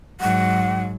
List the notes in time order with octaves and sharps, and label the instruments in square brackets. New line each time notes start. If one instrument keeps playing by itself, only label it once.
[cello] G#2 F#3 [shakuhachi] F#5